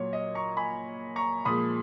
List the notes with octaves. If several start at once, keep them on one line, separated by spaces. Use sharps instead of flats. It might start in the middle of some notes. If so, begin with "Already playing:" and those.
Already playing: A#2 F#3 C#5
D#5
A#5 C#6
G#5 B5
A#5 C#6
A#2 F3 G#3 B5 D#6